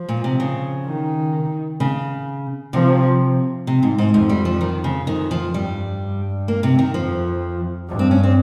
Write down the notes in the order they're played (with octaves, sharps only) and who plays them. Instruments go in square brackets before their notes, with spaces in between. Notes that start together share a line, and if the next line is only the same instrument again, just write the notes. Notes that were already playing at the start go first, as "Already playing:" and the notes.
Already playing: [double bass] F3
[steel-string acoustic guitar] A#2
C3
C#3
[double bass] D#3
[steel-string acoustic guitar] C#3
[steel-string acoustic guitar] C3 [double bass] F3
[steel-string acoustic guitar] C3
G#2
G#2
[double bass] F2 [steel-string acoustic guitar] G#2
[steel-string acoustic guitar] G3
F3
D#3
C#3
[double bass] F2 [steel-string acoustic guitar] D#3
[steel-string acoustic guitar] F3
[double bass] G2 [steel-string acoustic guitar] G3
[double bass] G2
[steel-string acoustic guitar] A#3
C3
D#3
[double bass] F2 [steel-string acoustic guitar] F3
[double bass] G2
[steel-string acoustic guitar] C4
C#4
C4